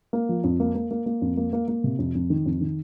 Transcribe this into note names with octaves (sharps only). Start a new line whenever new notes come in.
A#3
F3
F2
A#3
A#3
A#3
A#3
F2
A#3
A#3
A#3
C3
F2
F2
D#3
F2
D#3